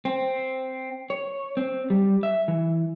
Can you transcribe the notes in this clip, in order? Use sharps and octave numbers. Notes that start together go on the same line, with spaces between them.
C4
C#5
C4
G3
E5
E3